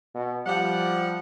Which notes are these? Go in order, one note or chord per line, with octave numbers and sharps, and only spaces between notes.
B2
F3 G3 F#5